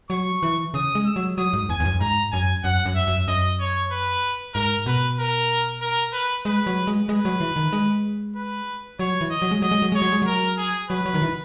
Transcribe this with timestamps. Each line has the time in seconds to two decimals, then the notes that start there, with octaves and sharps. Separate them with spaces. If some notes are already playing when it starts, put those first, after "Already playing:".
0.10 F#3 C#6
0.43 E3
0.74 C#3 D#6
0.95 G#3
1.05 E6
1.16 F#3
1.37 F#3 D#6
1.53 G#2
1.69 E2 G#5
1.80 E2
1.85 F#2
2.00 G#2 A#5
2.32 F#2 G#5
2.64 F#2 F#5
2.86 F#2
2.96 E5
3.07 F#2
3.28 F#2 D#5
3.60 C#5
3.91 B4
4.54 G#2 A#4
4.86 B2 B4
5.19 A#4
5.82 A#4
6.13 B4
6.45 G#3 B4
6.67 F#3
6.87 G#3
7.09 G#3 B4
7.25 F#3
7.40 E3
7.56 D#3
7.73 G#3
8.36 B4
8.99 F#3 C#5
9.21 E3
9.31 D#5
9.42 F#3
9.51 G#3
9.62 F#3 D#5
9.71 G#3
9.82 F#3
9.92 G#3 C#5
10.02 F#3
10.12 G#3
10.22 F#3 A#4
10.57 G#4
10.90 F#3 B4
11.06 F#3
11.14 D#3
11.22 E3